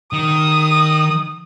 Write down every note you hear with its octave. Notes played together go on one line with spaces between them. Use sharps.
D#3 D#6